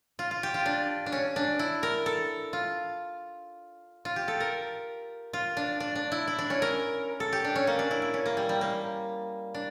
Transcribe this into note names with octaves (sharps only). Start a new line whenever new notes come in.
F4
F4
G4
F4
D4
D4
C#4
D4
E4
A#4
A4
F4
F4
G4
A4
A#4
F4
D4
D4
D4
E4
E4
D4
C#4
A#4
A4
G4
D4
C#4
A#3
D4
E4
E4
C#4
A#3
G3
G3
A#3
D4